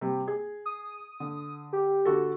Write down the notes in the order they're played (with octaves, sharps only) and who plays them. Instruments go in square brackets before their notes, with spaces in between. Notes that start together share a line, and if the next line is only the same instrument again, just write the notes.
[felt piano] C3 G3
G#4
[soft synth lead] D#6
[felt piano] D3
[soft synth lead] G4
[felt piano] D3 F#4 A4